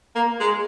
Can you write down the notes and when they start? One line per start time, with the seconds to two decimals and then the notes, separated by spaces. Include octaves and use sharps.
0.16 A#3
0.41 G#3